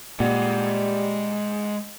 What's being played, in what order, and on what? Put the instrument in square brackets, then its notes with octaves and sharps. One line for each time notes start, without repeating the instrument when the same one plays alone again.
[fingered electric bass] A#2 [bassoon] G3 [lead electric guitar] G#3 F#5